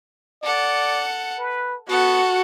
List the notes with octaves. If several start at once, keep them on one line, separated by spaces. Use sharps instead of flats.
A4 D5 F#5
B4
B3 F#4 A4 F#5